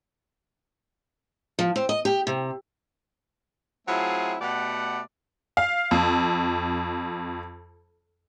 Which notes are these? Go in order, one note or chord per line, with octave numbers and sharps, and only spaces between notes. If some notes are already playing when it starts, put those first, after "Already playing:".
F3
C4
D#5
G4
C3
F#3 A3 C4 E4 F4 G#4
B2 A3 G4 D5 F#5 B5
F5
F2